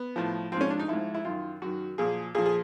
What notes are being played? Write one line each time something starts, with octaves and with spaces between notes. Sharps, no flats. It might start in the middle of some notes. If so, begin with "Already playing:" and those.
Already playing: B3
A2 F3
G#2 F3 C4 C#4
D4
D#4
G#2 F3 E4
E4
F#2 D#3 F4
F#2 D#3 F#4
A#2 F3 G#4
A#2 F3 G#4
G#4